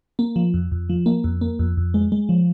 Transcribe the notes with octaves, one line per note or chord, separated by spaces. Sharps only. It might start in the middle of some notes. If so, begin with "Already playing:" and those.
A#3
F3
F2
F2
F3
A#3
F2
A#3
F2
F2
G#3
G#3
F3